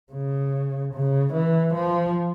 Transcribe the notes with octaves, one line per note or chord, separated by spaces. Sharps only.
C#3
C#3
E3
F3